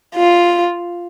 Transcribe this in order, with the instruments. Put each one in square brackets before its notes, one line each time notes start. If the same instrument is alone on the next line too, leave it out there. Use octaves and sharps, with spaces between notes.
[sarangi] F4